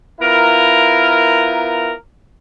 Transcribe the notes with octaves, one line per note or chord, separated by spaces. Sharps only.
B3 E4 F4 A#4